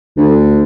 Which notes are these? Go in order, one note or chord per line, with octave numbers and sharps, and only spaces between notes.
D2